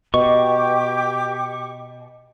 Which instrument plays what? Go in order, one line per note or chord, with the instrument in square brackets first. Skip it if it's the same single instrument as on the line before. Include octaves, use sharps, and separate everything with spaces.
[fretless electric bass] B2 [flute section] G4 G5 D6 [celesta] D#5 [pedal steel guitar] C#6